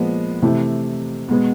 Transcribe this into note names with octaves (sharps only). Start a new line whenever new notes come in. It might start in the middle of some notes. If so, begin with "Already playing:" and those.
Already playing: A#2 F3 G#3 B3
C3 E3 A3
B2 G#3 B3